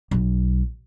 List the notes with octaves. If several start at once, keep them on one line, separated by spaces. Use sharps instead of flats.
B1